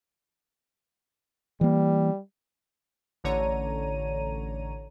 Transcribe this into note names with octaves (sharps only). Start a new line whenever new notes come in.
E3 G3 A#3
A1 D3 C#5 A#5 D#7